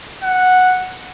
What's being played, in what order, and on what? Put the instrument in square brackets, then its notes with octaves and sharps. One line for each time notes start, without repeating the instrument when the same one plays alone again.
[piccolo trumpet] F#5